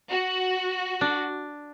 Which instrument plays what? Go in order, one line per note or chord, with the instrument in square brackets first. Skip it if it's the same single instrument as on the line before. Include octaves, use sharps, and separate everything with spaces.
[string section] F#4
[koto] D4